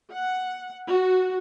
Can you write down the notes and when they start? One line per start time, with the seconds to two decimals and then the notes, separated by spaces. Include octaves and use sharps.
0.12 F#5
0.88 F#4